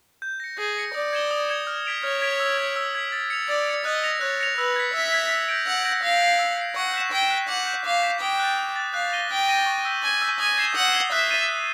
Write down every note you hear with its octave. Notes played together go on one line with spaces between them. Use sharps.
G6
A#6 C#7
G#4 G6
A#6 C#7
D5 D#6
G#6 C#7 E7 G7
D#6
G#6 C#7 E7 G7
F6
G#6 B6 D7 F7
C#5 F6
G#6 B6 D7 F7
E6
G#6 B6
E6
G#6 B6
A6
C#7 F7
D5 A6
C#7 F7
D#5 F#6
A#6 C#7 F7
C#5 F#6
A#6 C#7 F7
B4 E6
G#6 B6
E5 E6
G#6 B6
E6
G6 A#6 D7
F#5 E6
G6 A#6 D7
F5 E6
G6 C7
E6
G6 C7
F#5 C#6
F#6 B6 E7
G5 C#6
F#6 B6 E7
F#5 D6
G6 B6 E7
F5 D6
G6 B6 E7
G5 D#6
F#6 A6
D#6
F#6 A6
F5 F#6
A#6 D#7 G7
G5 F#6
A#6 D#7 G7
C#6
E6 G6 B6
G#5 C#6
E6 G6 B6
G#5 D#6
G#6 C7 E7 G7
F#5 D#6
G#6 C7 E7 G7
E5 F#6
A6 C7 D#7
F#6